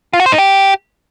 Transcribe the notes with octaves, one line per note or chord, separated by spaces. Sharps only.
F4
F#4
C5
D#4
G4